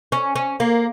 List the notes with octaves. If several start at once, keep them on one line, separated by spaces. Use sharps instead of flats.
C#4
C#4
A#3